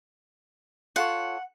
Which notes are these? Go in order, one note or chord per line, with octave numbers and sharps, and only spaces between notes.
F4 A4 C#5 F#5